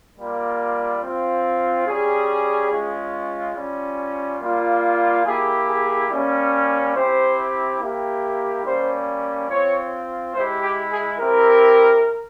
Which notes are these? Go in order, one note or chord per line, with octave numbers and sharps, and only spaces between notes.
G3 A#3 F4
C4 F4
G3 C#4 G4 G#4
G#3 C#4 F4
G3 C#4 F4
G3 A#3 F4
A#3 E4 G4 G#4
G#4
G3 A#3 C#4
C4 E4 G4 C5
A#3 E4 G4
G3 A#3 C#4 C5
C4 F4 C#5
G#3 E4 G4 C5
G4
G#4
C4 E4 G4 A#4